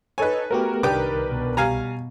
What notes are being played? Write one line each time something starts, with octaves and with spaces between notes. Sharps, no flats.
D#4 A4 B4 C#5 G#5
A3 B3 F#4 G4 A#4
C2 D#3 D4 G4 A#4 B4 G5 D6
B2
G3 F5 G#5 A#5